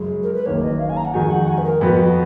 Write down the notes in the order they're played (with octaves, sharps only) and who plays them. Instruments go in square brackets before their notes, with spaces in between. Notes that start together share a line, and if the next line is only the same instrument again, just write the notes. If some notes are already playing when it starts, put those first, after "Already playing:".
Already playing: [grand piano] F#2 C#3 G#3
[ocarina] A#4
B4
[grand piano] F#1 F#2 D#3 A#3 [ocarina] C#5
[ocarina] D#5
F5
G#5
A#5
F#5
[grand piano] F2 D#3 G#3 D#4 F#4 [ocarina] G#5
[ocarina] F#5
G#5
B4
A#4
[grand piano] F2 F3 B3 F#4 [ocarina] B4